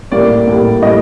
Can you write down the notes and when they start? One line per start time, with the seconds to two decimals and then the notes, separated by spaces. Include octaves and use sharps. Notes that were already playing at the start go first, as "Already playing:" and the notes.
0.12 A2 G3 A#3 D5
0.48 A2 G3 A#3
0.82 A2 G3 A#3 D#5